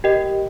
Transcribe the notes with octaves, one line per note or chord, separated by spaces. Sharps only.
G4 A#4 D#5 G5